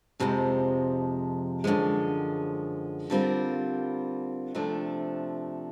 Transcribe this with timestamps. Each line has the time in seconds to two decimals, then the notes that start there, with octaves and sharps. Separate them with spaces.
0.20 F2 C3 F3 G#3
1.64 F#2 D3 F3 G#3
3.10 D3 G3 C4 F4 A#4
4.55 C3 F3 A3 D4